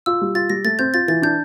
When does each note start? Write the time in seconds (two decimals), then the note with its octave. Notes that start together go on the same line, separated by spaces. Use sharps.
0.06 F4 E6
0.21 G3
0.35 F4 A6
0.50 G3 A#6
0.65 A3 A6
0.79 C4 G6
0.94 F4 A6
1.08 E3 A6
1.22 D4 G6